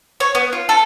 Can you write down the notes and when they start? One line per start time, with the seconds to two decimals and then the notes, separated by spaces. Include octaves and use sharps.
0.20 C#5
0.35 B3
0.53 F4
0.69 A4